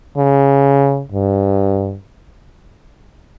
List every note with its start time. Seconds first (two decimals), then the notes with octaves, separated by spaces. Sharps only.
0.17 C#3
1.12 G2